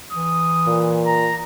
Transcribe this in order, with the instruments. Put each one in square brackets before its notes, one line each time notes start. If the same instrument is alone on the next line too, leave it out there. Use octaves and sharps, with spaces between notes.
[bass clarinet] E3 [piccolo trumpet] D#6
[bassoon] A#2
[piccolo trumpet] A#5